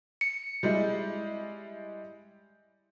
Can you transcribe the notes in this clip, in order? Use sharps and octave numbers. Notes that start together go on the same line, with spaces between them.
C#7
G3 G#3 E4